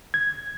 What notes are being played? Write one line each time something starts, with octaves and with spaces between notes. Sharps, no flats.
G#6